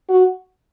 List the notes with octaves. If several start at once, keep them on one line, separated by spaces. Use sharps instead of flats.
F#4